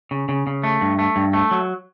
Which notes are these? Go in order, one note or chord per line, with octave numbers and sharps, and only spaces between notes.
C#3
C#3
C#3
A3
G2
A3
G2
A3
F#3